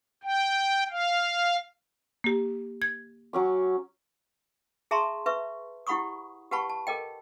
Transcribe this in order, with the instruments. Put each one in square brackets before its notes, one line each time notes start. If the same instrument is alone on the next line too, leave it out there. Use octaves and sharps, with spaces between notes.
[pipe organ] G5
F5
[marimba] A#3 G4
G#6
[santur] F#3 C#4 D6
[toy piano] G#4 E5 A5 A#5 C6 C#6
B4 E5 C#6
E4 G4 F#5 B5 C#6 D#6
G4 B4 F#5 A5 B5 C#6
A5
A4 A#4 D#5 G5